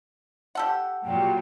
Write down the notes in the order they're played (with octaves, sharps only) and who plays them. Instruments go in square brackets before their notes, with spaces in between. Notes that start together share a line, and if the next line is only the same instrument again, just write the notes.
[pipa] G4 A4 F#5
[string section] A#2 F#3 G3 [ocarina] G5